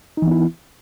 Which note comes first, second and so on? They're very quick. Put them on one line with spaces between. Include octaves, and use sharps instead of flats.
D#4 E3 B3 E4